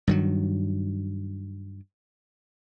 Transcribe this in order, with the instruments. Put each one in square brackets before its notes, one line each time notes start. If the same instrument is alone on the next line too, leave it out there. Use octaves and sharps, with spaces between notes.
[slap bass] G2 D#3 F#3